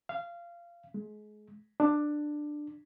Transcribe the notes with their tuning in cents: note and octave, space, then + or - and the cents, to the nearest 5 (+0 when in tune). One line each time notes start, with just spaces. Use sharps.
F5 -20
G#3 +30
D4 +15